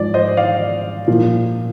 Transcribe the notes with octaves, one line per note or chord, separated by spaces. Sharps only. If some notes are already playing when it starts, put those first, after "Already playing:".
Already playing: G#2 F3 D5
C5 D#5
D5 F5
A#2 F3